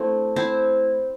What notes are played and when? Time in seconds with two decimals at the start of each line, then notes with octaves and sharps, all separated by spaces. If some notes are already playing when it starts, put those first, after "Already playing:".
Already playing: A3 C4 D4 E4
0.36 C4 E4